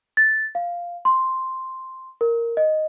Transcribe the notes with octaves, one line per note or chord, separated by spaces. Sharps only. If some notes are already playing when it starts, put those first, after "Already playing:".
A6
F5
C6
A#4
D#5